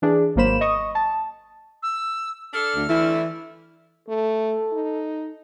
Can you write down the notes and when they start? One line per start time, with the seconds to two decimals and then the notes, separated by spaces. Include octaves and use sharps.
0.02 E3 D4 G#4
0.36 G#1 F#3 A#3 C5 B5 E7
0.61 D#5 C#6 D#6
0.95 A5
1.83 E6
2.54 D4 A4 F6
2.76 D2
2.89 D3 E3 A3 E4
4.09 A3 A4
4.73 D#4